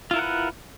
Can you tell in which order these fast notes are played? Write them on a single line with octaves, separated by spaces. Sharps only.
F4 E4 A#4 F#5 B4